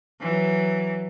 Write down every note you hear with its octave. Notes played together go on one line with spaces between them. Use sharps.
E3 F#3